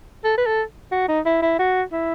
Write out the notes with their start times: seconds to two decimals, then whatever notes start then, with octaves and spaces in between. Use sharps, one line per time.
0.24 A4
0.38 B4
0.46 A4
0.92 F#4
1.08 D#4
1.25 E4
1.42 E4
1.59 F#4
1.92 E4